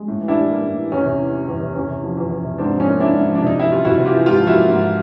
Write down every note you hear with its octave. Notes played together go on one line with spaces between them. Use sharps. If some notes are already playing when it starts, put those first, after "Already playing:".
Already playing: G#3
A2
E3
D4 E4
G3
A#3
A2
E3
E2 C#4 D#4
C3
E3
G3
E2
C3
E2 C#4
C3
F3
E2
E2
C3
G#2 C4 D4
F3
C#4 D#4
A#3
G#2 D4 E4
G#2
F3
D4
C3 D#4
E3 E4
G3 F4
C3 E4 F#4
C3
F4 G4
E3
G#2 F4 G4
F3
E4 F#4
A#3
G#2